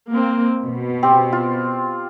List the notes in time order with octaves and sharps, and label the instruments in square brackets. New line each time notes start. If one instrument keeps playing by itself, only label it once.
[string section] A#3 C4
B2
[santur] C4 G4 C5
F4